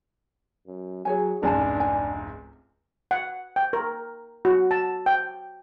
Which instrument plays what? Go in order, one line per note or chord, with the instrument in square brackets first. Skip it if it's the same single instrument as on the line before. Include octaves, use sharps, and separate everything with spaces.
[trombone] F#2
[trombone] F#3 [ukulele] G#4 C#5 G#5
[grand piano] F1 C#2 G#2 [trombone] D4 [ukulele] D5 G#5 A5
[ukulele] G#5
[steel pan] F#5
G5
A#4
F#4
A5
G5